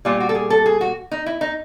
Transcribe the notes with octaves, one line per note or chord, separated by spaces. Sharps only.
A#2 G3 F4
F#4
A4
G#4
A4
G#4
F#4
D#4
E4
D#4